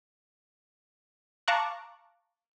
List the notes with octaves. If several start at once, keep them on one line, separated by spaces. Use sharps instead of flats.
F5 A5 A#5 C#6 D6 F#6